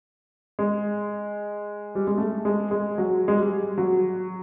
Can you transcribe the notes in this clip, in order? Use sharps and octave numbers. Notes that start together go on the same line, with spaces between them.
G#3
G3
G#3
A3
G#3
G#3
F#3
G#3
G3
F#3